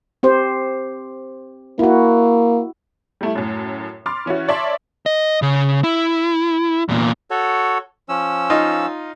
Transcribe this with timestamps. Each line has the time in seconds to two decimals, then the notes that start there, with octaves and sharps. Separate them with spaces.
0.23 C4 G4 C5
1.79 A#3 E4 F#4
3.21 G3 A3 E4
3.35 F#2 A2
4.06 B5 C6 D6 F6 A6
4.26 E3 C#4 E4 F#4
4.48 C#5 D5 E5 A5 C6
5.06 D#5
5.42 C#3
5.84 E4
6.89 E2 A#2
7.31 F#4 A4 C#5
8.09 F3 C#4 E6
8.50 D#4 F4